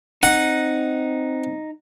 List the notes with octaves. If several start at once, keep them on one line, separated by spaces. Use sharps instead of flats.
C4 D#4 F#5